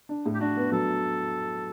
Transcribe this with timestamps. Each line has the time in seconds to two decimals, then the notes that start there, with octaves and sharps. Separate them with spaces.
0.09 D4
0.26 A2
0.34 G4
0.40 D4 F#4
0.57 B3
0.72 F#3 A4